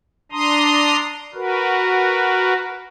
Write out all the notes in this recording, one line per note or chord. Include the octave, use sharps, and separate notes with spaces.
D4 A#5 C6 D#6
F#4 A#4 B4